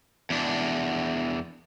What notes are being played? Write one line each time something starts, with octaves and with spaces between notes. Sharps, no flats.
E2 D4